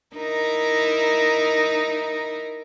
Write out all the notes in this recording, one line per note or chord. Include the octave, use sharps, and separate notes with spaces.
D#4 E4 A#4